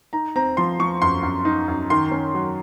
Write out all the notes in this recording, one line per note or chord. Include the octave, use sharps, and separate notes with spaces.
D#4 A#5
C4 A#5
F3 C6
F3 C#6
F#2 C6
F#2
D#4
F#2
D#3 C6
C#4
F#3